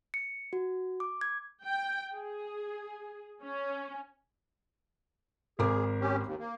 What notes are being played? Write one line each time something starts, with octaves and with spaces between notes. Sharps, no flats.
C#7
F#4
D6
G#6
G5
G#4
C#4
G#1 G#4 A#4 D6
C#4 G4
D#2
A#3